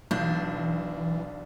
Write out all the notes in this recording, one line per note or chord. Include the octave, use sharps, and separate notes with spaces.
B1 E3 D4 G6